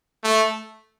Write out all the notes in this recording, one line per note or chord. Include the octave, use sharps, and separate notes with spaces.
A3